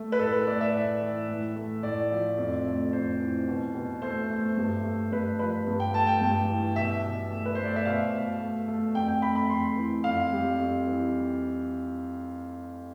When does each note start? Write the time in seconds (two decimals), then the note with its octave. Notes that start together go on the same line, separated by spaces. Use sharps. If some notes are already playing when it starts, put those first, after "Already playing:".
Already playing: A3
0.12 B4
0.19 A2 A4
0.32 B4
0.47 A3 D5
0.61 E5
0.74 A2
1.01 E3
1.29 A2
1.56 A3
1.83 A2 D5
2.11 F3
2.38 F2
2.65 A3
2.93 F2 C5
3.20 E3
3.48 B2
3.75 B2
4.02 A3 C5
4.30 A3
4.57 G2
4.85 A3
5.12 G2 B4
5.39 F3 B4
5.67 G2
5.80 G5
5.94 A3 A5
6.07 G5
6.21 G2
6.48 E3
6.76 B2 E5
7.04 B2
7.31 A3
7.45 B4
7.55 A3 C5
7.65 D5
7.76 E5
7.85 B2 F5
8.13 B2
8.40 A3
8.68 A3
8.95 F2 G5
9.08 G5
9.22 A3 B5
9.35 B5
9.49 F2 C6
9.76 E3
10.04 F2 F5
10.32 G3
10.59 F2
10.87 E3